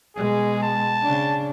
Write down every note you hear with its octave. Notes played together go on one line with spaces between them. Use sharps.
B2 G#3 G#4
A5
C#3 D4